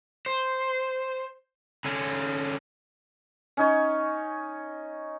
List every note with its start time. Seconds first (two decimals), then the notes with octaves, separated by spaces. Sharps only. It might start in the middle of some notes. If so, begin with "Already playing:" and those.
0.26 C5
1.85 D3 C#4
3.57 C#4 D#4 C#5